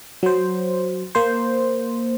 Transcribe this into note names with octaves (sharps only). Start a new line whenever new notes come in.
F#3 C5
A#3 C5